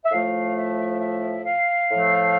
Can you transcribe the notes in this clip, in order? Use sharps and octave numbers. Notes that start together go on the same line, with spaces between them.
E5
A2 F3 A3 F5
E5
E5
F5
A2 F3 A3